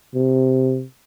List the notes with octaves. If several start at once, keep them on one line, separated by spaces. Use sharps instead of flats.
C3